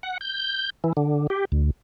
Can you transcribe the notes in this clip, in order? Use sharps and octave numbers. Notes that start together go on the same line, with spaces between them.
F#5
G6
E3
D3
G4
D2